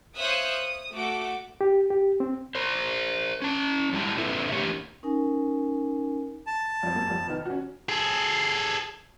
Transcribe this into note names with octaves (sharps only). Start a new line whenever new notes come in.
C5 C#5 E5 F5 D#6 F#6
D#6
A3 F#4 D6
G4
G4
C4
A#4 C5
C#4 A5
A2 G3 G#3 E4 A5
A#2 D3 C4 A4 B4 E5
E3 A3 D4 G4 A#4 C#5
C#4 D#4 A#4 G#5
A5
F2 C4
F#2 A#3
F1 F2
D#3 B3
C#4 F#4
G#4 A4